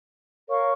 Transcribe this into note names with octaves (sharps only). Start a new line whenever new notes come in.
A#4 C#5 F5 C#6